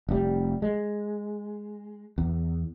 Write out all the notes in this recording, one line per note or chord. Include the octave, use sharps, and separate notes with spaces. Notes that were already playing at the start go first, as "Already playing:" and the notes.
F1 G3
G#3
E2